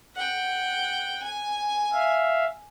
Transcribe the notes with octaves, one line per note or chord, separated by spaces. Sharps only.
F#5 G5
G#5
E5 F5